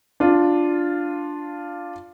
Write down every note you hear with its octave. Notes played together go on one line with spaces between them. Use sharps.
D4 F4